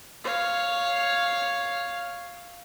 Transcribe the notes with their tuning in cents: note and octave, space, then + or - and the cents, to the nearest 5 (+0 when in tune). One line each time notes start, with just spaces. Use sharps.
C#5 +0 F5 +0